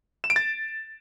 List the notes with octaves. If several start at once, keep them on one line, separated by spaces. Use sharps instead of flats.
E7
D7
A6